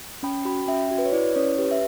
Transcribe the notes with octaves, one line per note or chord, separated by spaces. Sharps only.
C#4 G5 B5
F#4 G5 B5
C#4 E5 G5
F#4
B4
C#5
E4 B4 D5
C#4 C#5
G4 B4
E5